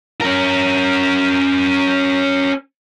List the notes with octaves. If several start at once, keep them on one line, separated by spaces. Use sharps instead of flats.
C#4 A#4